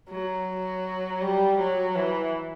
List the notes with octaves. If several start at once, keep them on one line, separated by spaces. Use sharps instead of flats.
F#3
G3
F#3
E3